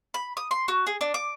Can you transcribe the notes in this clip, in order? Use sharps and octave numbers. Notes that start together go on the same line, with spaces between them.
B5
D#6
C6
F#4
G#4
D4
D6